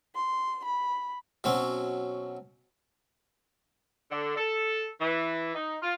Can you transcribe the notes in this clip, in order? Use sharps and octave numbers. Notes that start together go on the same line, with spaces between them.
C6
B5
B2 F#3 C4 C#4
D3
A4
E3
D#4
F4